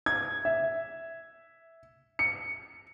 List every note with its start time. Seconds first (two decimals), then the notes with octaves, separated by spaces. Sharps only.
0.06 G#6
0.45 E5
2.19 C#7